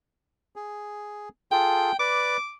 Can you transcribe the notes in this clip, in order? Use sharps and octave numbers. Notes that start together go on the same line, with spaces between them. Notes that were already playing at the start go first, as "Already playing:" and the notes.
G#4
F4 G#4 A4 G5
B4 D5 D6